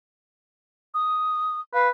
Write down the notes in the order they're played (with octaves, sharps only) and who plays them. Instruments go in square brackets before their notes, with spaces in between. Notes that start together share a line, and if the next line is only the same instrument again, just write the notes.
[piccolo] D#6
[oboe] B4 [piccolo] F5